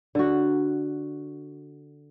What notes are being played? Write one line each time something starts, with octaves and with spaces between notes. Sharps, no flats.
D3 F#4